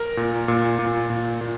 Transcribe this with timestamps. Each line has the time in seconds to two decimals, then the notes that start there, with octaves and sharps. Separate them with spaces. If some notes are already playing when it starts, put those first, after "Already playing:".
Already playing: A#4
0.17 A#2
0.48 A#2
0.79 A#2
1.10 A#2
1.41 A#2